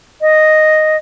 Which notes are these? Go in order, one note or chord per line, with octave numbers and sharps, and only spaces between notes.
D#5